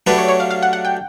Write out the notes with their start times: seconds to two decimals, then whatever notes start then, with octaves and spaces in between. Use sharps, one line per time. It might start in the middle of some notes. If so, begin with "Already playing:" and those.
0.07 F#3 A3 D4 G4 B4
0.18 C#5
0.28 C#5
0.40 F5
0.51 F5
0.63 F#5
0.73 F#5
0.85 G5